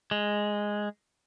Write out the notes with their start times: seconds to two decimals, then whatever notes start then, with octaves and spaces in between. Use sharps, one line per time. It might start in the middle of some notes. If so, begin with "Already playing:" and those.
0.11 G#3